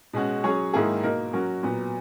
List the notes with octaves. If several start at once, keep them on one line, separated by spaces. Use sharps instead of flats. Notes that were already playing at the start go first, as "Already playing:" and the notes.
B2 G#3 C#4 F#4
F#3 C#4 G#4 C#5
G#2 D#3 A#3 E4 G#4
B2 A#3 D#4 A#4
F#3 C#4 F#4 A#4
A#2 F#3 B3